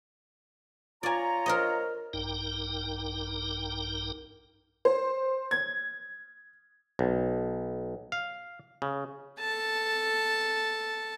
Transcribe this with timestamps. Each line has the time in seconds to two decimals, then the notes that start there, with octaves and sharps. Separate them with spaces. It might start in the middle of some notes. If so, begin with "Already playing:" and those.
1.03 F4 C#5 D5 G#5 A#5
1.46 A#4 C5 D#5
2.13 A#1 G2 D#4 A#4 G5
4.85 C5
5.51 G#6
6.99 B1
8.12 F5
8.82 C#3
9.41 A4 A5